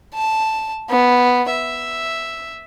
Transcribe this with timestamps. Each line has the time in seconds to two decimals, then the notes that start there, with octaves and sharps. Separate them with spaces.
0.15 A5
0.90 B3
1.51 E5